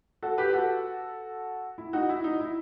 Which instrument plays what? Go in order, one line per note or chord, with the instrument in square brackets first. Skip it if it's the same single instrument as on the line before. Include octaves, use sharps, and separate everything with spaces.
[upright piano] F#4 A4
G4 B4
F#4 A4
E4
D#4 F#4
E4
D#4
E4